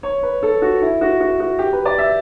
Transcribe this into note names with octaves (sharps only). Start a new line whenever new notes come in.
C#5
B4
A4
F#4
E4
F#4
F#4
F#4
G4
B4
D5
E5